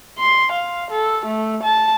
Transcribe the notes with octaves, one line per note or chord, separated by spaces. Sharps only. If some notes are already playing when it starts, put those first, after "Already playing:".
C6
F5
A4
A3
A5